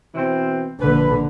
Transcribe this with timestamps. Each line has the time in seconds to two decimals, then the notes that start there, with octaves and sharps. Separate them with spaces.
0.14 B2 E3 C4
0.80 A#1 D3 B4